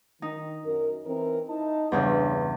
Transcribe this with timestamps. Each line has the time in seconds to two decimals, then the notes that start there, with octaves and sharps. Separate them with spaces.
0.22 D#3 D#4
0.65 F#2 A#4
1.06 E3 C4 A#4
1.48 D#4 E4 A5
1.92 E2 G2 C#3 D4 G#4 B4